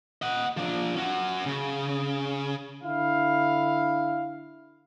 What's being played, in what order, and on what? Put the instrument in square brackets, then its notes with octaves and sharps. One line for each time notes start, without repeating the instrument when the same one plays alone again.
[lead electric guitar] D#5 F#5
F3 D4
C#4 F#4
C#3
[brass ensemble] D3 E4 F5